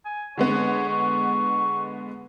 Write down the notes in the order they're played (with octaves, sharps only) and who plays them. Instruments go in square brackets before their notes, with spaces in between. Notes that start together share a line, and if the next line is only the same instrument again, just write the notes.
[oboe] G#5
[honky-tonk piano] D3 G#3 B3 [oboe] C#5
[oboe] C#6